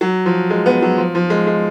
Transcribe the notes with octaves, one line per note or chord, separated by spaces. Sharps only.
F#3
F3
G#3
B3
F#3
F3
F3
G#3
G#3